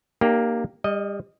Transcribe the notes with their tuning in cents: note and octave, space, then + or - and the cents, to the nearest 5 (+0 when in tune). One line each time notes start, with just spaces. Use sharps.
A#3 +0 D#4 -45 G4 +0
G3 +35 D#5 +0